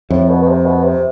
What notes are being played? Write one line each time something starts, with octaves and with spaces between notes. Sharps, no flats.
F2 A2
B2
B2
C3
B2
C3